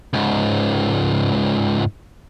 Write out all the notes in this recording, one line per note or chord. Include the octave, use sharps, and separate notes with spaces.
C#2 G#2